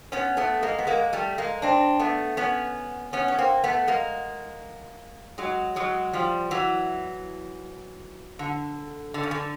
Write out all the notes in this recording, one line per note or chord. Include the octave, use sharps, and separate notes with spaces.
B3 C#4
A3 B3
G#3 A#3
B3
G#3 A#3
G3 A3
G#3 A#3
C4 D4
A3 B3
B3 C#4
B3 C#4
C#4
A#3 C4
A3 B3
G#3 A#3
F#3 G#3
F#3 G#3
F3 G3
E3 F#3
D3
D3
C#3
D3